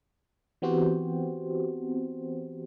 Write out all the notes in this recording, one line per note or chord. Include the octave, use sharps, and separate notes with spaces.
E3 B3 C4 F#4 G4 C5